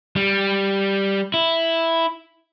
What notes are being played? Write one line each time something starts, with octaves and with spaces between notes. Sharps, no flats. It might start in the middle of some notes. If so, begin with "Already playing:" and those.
G3
E4